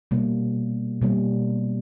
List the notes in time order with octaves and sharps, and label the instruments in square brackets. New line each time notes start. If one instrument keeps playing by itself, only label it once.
[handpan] B2 G3 A#3
B2 G3 A#3